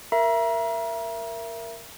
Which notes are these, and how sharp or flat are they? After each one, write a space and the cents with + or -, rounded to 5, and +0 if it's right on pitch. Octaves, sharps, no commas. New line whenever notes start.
A#4 -5 E5 +25 A#5 +35